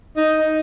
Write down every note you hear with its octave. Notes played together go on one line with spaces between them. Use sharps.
D#4